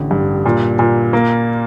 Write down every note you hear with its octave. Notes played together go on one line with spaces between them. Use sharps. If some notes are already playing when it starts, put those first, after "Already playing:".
Already playing: A1 D3
G2
A#2
A#2
A#3